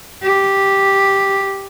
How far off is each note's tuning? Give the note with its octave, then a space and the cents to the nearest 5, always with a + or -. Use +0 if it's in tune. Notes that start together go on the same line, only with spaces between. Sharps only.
G4 +0